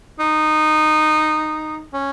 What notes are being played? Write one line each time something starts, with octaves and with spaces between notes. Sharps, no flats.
D#4
C#4